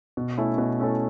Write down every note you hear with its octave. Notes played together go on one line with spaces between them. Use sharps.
B2
A3 C#4 E4 A4
B2
A3 C#4 E4 A4